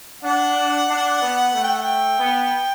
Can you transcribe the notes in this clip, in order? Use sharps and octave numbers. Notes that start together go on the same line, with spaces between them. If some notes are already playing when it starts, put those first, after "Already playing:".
D4 F#5
D4
B3
A3
G5
F#5
G5
B3